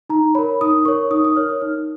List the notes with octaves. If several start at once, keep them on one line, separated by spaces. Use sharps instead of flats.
D#4 A#5
A#4 C#5 B5
D#4 D#6
A#4 C#5 C#6
D#4 D#6
D#6
A#4 C#5 F6
D#6
D#4 F6